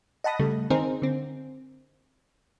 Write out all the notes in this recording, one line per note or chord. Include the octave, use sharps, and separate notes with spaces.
D#5 F#5 A5 B5 D#6 A#6
C#3 G3 A3
D#3 C4 D#4 G#4 A#4 C5
D3 C4